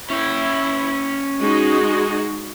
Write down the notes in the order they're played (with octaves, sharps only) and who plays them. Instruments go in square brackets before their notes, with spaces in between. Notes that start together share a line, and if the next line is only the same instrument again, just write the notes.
[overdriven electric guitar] C#4 G5 [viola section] E4
[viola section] G#3 D#4 F#4